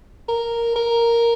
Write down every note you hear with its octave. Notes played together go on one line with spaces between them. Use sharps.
A#4
A#4